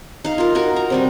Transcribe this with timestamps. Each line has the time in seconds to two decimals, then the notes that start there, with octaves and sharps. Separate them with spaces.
0.24 D#4 F5
0.38 F4 A#4
0.55 D#4 F#4 A#4
0.76 A#5
0.90 C3 G3 C4